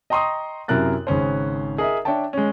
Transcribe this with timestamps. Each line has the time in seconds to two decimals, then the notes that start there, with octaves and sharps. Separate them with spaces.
0.10 D#5 G5 A#5 C6 C#6 D#6
0.68 F#2 C3 E4 A#4 F#6 A6
1.07 G#1 C#3 C#4 C5
1.78 G#4 A#4 D#5 E5
2.05 D4 C#5 E5 G5 A5
2.33 G#3 C#4